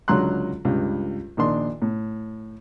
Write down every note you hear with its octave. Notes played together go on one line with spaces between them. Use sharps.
C#2 D3 F#3 A#5 C6 F#6
C#2 G2
A#1 D#3 D4 C6
A2